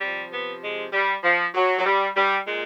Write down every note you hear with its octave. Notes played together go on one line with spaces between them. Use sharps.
C3 F3 G3
B3
G#3
G3
F3
F#3
F#3
G3
G3
A#2 G#3